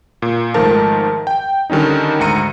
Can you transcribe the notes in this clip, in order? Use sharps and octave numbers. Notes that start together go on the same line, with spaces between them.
A#2
G#2 D#3 F3 A3 A#4 A5
G5
D3 D#3 G3 C#4 D#4
D2 G#2 A#5 C#7 D#7